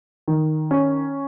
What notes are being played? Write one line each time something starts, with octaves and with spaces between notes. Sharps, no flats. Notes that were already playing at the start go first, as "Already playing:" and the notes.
D#3
C#4